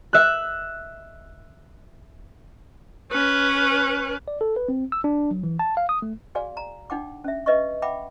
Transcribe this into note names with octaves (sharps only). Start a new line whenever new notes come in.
E5 F#6
C#4 B4
D5
A4
B4
C4
E6
D4
F#3
E3
A5
F5
D#6
A3
F#4 G#4 D5 F5 G#5
A#5
D4 D#4 F#5 G5 D6
C#4 E5
B4 D#5 E5 C#6
E5 F#5 G5 B5 D6